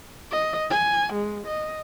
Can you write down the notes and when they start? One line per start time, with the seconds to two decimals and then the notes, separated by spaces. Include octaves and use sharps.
0.31 D#5
0.70 G#5
1.13 G#3
1.47 D#5